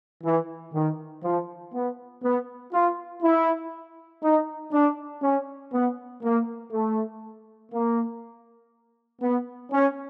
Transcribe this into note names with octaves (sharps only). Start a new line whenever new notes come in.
E3
D#3
F3
B3
B3
F4
E4
D#4
D4
C#4
B3
A#3
A3
A#3
B3
C#4